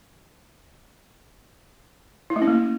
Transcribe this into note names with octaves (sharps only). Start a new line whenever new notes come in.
E4
A3
C#4
A#3